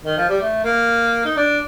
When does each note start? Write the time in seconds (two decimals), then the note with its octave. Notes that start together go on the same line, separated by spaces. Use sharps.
0.05 D#3
0.18 F3
0.29 G3
0.41 A3
0.65 A#3
1.25 D#4
1.37 D4